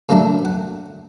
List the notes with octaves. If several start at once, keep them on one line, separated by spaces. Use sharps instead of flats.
A#2 C#3 F#3 A3 D4 A4
F#5